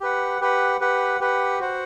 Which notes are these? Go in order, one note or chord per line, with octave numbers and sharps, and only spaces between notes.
G4 B4 F#5
G4 B4 F#5
G4 B4 F#5
G4 B4 F#5
F#4 C5 F#5